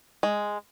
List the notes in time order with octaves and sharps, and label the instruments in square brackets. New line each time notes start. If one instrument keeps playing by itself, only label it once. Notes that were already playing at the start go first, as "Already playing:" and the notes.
[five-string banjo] G#3